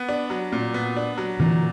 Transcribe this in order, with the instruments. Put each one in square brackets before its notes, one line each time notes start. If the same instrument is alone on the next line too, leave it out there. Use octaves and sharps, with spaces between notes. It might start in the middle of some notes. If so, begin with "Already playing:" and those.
Already playing: [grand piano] B3
D4
F#3
A#2
B3
D4
F#3
[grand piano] A#2 [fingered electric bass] D3 E3